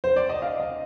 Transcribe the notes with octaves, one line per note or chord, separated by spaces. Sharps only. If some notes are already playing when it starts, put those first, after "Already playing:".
C5
D5
D#5
F5
D#5